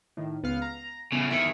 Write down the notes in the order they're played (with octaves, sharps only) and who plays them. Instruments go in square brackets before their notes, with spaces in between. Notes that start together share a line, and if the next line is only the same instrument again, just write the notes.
[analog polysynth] A2 D#3
C#2 B3 F5
A#5
[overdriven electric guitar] C#3 E3 [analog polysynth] B3
[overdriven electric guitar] E2 D#3 [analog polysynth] E5 G#5 B5